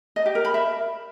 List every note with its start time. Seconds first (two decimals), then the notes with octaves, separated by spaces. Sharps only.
0.16 D#5
0.26 G4
0.35 A#4
0.45 B5
0.54 E5